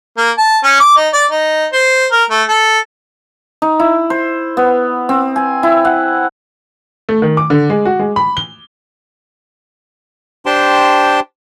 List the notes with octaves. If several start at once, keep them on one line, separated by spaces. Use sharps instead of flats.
A#3
A5
C#4
D6
D#4
D5
D#4
C5
A#4
A3
A4
D#4
E4
C5
B3
C4
G#5
E4
F#5
A3
D#3
D6
D3
G#3
F#4
G#3
B5
G7
D4 G4 C5 G5 A5 C6